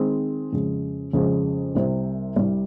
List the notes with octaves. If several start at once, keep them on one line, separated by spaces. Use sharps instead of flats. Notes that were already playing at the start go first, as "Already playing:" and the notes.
Already playing: D#3 G#3 C4
F2 C#3 G#3
F2 C#3 G#3
C2 C3 G3
C2 C3 G3